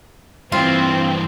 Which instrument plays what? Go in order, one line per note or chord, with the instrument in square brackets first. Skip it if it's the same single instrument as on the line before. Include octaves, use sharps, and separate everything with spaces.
[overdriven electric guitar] G2 E3 [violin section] C4 [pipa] F4